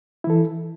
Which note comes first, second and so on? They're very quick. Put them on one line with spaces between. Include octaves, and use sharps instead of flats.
E4 E3 A4